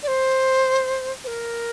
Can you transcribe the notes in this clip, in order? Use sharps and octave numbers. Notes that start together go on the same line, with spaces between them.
D5
C5
C5
A#4